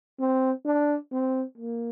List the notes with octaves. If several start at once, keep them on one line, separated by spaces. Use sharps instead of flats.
C4
D4
C4
A#3